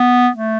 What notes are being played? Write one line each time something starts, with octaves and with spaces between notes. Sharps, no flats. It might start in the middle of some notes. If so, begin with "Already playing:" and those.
Already playing: B3
A3